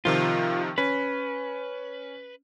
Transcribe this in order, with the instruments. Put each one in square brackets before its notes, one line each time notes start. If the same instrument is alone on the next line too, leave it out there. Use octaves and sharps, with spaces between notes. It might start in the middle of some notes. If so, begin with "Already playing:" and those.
[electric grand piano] C3 D#3 F3 [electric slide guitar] F4
[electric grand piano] C#4 [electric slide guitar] B4